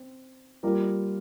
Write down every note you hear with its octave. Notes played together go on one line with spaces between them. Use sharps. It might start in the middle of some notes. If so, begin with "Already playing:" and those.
Already playing: C4
G3 A#3 F4 A#4